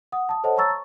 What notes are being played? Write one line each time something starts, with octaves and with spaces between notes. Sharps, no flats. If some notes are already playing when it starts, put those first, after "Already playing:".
F#5 D#6
A5 D#6
A4 C5 C#5 D#5 F#5 A5
C#5 A5 A#5 C#6 E6 A6
C#6